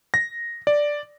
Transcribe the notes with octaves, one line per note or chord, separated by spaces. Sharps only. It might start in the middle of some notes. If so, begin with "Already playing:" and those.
A#6
D5